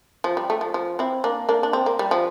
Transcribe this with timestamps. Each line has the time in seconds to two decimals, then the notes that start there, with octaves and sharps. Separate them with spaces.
0.24 F3
0.37 G3
0.50 A3
0.61 F3
0.74 F3
0.99 C4 E4
1.24 A#3 D4
1.49 A#3 D4
1.63 D4
1.73 C4
1.86 A#3
1.99 G3
2.11 F3